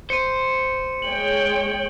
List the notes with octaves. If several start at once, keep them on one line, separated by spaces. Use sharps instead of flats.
C5 C#7 D#7
G#3 C#5 G5 F#7